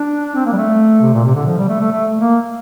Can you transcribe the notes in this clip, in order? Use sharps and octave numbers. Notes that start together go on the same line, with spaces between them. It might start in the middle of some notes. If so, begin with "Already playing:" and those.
Already playing: D4
C4
A#3
G3
A3
C3
A#2
C3
D3
F3
G3
A3
A3
A3
A#3